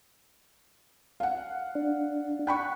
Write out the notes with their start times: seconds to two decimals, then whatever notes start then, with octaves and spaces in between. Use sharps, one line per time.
1.20 F5 F#5
1.75 D4
2.47 F#5 G5 B5 C#6